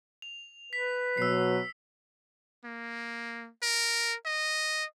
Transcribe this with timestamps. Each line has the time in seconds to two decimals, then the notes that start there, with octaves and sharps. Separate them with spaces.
0.22 F7
0.73 B4 B6
1.17 B2 F#3 E6 C7
2.65 A#3
3.63 A#4
4.25 D#5